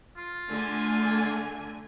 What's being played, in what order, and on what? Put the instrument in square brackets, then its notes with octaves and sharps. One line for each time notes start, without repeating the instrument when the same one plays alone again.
[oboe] F4
[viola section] D3 A3 G#5